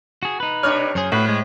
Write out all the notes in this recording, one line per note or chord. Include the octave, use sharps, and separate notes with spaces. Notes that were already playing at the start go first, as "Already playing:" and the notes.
F#4 G#4
D#4 B4
C3 D4 C#5 F6
F#2 G#4 C5
A2 F#4 B4
G#3